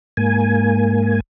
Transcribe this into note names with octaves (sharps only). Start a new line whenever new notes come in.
G#2 A#3 G#5